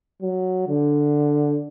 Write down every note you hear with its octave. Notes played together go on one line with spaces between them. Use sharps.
F#3
D3